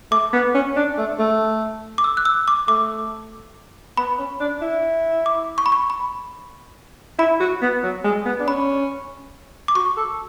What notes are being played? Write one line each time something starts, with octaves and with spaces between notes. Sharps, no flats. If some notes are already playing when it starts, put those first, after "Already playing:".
A3 D6
B3
C#4
D4
A3
A3
D6
E6
F#6
E6
D6
A3 D6
B3 B5
C#4
D4
E4
D6
C#6
B5
C#6
B5
E4 B5
F#4
B3
F#3
G#3
B3
D4
C#4 B5
D6
F#4 C#6
A4